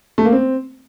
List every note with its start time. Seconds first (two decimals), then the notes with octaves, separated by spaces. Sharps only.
0.18 A3
0.25 A#3
0.32 C4